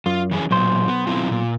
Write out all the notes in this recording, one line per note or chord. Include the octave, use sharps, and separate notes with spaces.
F#2 F4
E3 C#4 G#4
B1 A#2 F#3 C5
B3
C4 E4 F4
A#2